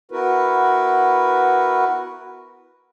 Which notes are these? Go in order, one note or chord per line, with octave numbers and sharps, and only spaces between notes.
B3 E4 F#4 A#4 B4